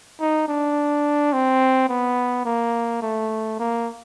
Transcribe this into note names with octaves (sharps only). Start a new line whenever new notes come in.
D#4
D4
C4
B3
A#3
A3
A#3